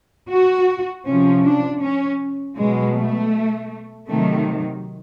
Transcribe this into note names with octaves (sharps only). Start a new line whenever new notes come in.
F#4
C3 F3 C#4
D4
C#4
B2 F#3 G#3
A3
C3 D#3 F#3 A3